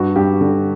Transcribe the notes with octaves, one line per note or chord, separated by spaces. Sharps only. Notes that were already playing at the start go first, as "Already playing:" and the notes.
Already playing: G2 F#4
G2 G4
D3